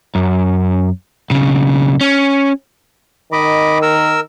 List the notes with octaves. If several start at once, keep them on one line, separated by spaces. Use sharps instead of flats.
F#2
B1 C#3
C#4
D#3 D#5 B5 D6
A#4 E6